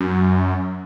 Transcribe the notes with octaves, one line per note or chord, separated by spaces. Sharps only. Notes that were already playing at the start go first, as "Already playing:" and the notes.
F#2